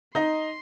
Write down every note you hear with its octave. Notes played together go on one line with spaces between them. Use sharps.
D#4 D#5 C6